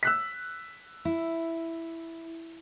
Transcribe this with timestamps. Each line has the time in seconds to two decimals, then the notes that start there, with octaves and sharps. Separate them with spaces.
0.03 E6 F#6 B6
1.05 E4